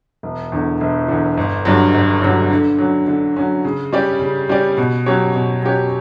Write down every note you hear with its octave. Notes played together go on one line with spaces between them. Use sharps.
E1
E2 D3
E1
E2 D3
G1
G2 D3 F#3
G1
G2 D3 F#3
D3
F#3 C#4
D3
F#3 C#4
C#3
G3 C#4 G4 D5
C#3
G3 C#4 G4 D5
B2
F#3 C#4 G4 C#5
B2
F#3 C#4 G4 C#5